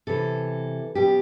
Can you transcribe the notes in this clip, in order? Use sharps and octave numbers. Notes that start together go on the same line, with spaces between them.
C3 E3 A4
B2 G4